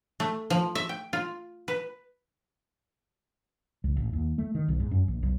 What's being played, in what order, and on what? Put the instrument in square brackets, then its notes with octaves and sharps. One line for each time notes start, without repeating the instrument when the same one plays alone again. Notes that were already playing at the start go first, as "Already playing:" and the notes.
[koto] A3
F3
E5
G5
F4
B4
[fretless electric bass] C#2
A1
D#2
A3
D#3
B1
G#2
F#2
A#1
B1